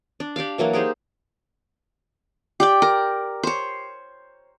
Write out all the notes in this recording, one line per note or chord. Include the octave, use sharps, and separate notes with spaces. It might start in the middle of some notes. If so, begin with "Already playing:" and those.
D4
D4 G4 D5 F5
E3 F#3 A#3 F#4
D#4 G4 G#4 C5
G4 D5 G5
A#4
C5 C#5